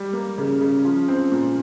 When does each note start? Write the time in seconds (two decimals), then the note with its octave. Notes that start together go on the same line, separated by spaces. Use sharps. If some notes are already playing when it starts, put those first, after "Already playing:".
Already playing: G3
0.13 A#3
0.38 C#3
0.61 C#3
0.85 F3
1.08 C4
1.32 A#2